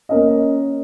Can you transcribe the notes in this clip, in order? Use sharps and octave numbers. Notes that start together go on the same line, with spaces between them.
A#3 C#4 A#4 D#5